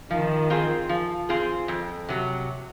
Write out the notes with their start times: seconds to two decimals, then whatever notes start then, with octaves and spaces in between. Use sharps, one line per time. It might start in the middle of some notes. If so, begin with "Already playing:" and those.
0.10 D#3 F3
0.50 C4 F4 G#4
0.89 F3
1.29 C4 F4 G#4
1.68 F2
2.09 C3 F#3